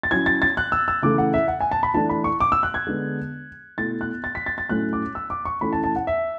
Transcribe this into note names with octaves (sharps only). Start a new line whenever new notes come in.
A6
F#3 C#4 E4 G#6
A6
A6
F#6
E6
E6
C#3 E3 A3 D6
F#5
E5
F#5
G#5
A5
B5
E3 A3 D4 A5
B5
C#6
D6
E6
F#6
G#6
D3 G#3 B3 D4
B2 A3 E4 A6
F#6
A6
B6
A6
A6
A2 F#3 A3 C#4 E4 F#6
D6
E6
D6
C#6
E3 A3 C#4 E4 B5
A5
A5
F#5
E5